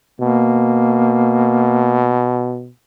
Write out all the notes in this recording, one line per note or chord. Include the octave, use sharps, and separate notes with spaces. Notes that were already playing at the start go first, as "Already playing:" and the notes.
B2 A#3